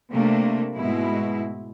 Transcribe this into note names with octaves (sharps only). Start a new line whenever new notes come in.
C3 A3 A#3 D4
G#2 B2 G#3 E4